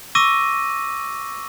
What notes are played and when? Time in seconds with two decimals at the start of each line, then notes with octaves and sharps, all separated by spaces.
0.15 C#6 D6 E6 A#6 D#7